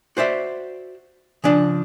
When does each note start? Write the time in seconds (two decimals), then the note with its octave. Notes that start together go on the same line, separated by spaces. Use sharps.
0.17 F#4 C5 D5 E5
1.44 C#3 F3 D4